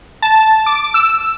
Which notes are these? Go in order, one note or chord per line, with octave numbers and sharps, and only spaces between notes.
A5
D6
E6